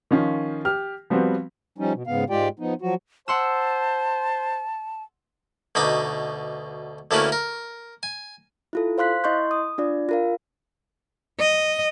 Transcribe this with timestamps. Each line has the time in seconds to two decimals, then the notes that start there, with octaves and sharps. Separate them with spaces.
0.11 D#3 F3 C#4 F4
0.65 G4 F6
1.10 F3 G3 B3 C4 F#4
1.78 F3 G3 C#4 D#4
1.94 B2
2.07 G#2 C#3 B3 F5
2.30 G#2 G#3 F4 G4 D5 G5
2.59 F3 B3 D#4
2.82 F3 F#3 F#4
3.28 C5 F#5 A5 C6 E6
5.75 D2 B2 D#4 B5 D6
7.11 D2 A3 A#3 C#4 E4 B4
7.32 A#4
8.03 G#5
8.73 E4 F4 A4
8.98 C5 F5 C6 F#6 B6
9.24 E4 D#5 C6 C#6 G6
9.51 D#6
9.78 D4 F4 D5
10.09 F4 A#4 F5
11.40 D#5